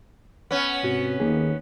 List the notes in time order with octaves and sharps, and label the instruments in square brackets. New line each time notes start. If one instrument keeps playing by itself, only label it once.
[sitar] B3 C#4
[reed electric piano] G#2 F#4 [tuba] C3
[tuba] D#2 [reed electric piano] D#3 A#3 G#4